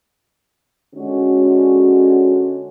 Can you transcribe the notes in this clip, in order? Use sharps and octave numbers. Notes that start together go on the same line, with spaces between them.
D3 G#3 C#4 F#4